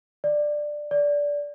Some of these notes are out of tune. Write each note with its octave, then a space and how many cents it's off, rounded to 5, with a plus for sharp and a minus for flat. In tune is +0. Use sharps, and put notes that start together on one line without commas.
D5 +10
D5 -15